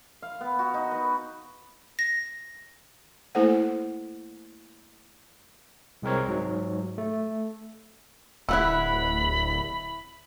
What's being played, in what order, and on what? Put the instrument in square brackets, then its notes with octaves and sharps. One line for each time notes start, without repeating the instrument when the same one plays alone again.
[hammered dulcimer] F5
B3
F#4
D#4
B4
[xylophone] A#6
[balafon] A3 A#3 E4 A4 C5 F#5
[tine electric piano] C2 G#3 C4 A#4 C#5
G#2 F#3
A3
[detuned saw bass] D1 [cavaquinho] E4 F4 F#5 [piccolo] B5 [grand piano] E6 F#6